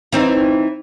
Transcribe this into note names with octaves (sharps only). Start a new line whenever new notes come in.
E3 C4 D#4